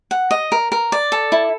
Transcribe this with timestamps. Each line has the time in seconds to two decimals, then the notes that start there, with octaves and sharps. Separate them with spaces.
0.11 F#5
0.31 D#5
0.52 A#4
0.72 A#4
0.92 D5
1.12 A4
1.32 E4